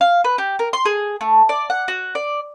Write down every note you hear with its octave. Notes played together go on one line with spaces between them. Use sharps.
F5
B4
G4
A#4
C6
G#4
A3
D5
F#5
F#4
D5